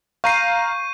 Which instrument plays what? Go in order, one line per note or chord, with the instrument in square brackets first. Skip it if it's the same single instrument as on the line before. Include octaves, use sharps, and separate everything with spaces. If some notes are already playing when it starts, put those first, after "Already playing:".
[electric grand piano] F5 A#5 C7 [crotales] C#6 G6 D#7